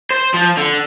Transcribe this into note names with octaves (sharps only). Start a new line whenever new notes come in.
C5
F3
D3